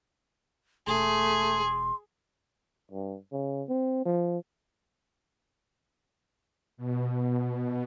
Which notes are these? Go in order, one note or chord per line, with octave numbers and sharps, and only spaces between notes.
E1 A3 G#4 C6
G2
C#3
C4
F3
B2